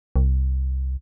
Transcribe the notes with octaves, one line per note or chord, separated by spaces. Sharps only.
C2